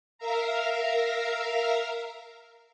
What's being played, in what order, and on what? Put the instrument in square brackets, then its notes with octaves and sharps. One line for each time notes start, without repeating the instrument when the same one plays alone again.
[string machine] A#4 E5 F5 A#5